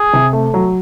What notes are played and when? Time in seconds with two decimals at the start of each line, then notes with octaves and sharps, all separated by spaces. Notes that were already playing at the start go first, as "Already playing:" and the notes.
Already playing: G#4
0.13 C3
0.33 A3
0.54 F#3